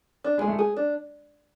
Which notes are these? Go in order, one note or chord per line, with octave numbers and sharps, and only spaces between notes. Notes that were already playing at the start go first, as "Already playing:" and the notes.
D4
G#3 G#4
A3
G#4
D4